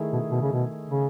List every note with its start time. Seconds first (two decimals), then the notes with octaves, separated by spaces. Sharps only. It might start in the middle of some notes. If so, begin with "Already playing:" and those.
Already playing: D#3 A3 E4 G#4
0.13 B2
0.31 B2
0.42 C#3
0.53 B2
0.89 C#3